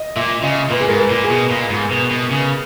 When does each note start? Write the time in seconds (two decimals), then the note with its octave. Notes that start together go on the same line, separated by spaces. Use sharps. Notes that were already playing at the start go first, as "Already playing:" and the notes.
Already playing: D#5
0.16 A#2 E5
0.43 C#3 D#5
0.70 A#2 B4
0.80 G#4
0.88 G#2 A#4
0.97 B4
1.11 A#2
1.24 G#4
1.30 B2
1.50 A#2
1.70 G#2
1.91 B2
2.11 B2
2.31 C#3